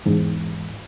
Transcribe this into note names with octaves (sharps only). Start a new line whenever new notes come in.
E2 G#2